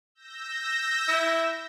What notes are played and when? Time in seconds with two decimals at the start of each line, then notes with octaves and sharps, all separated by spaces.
0.15 E6 G6 A#6
1.08 E4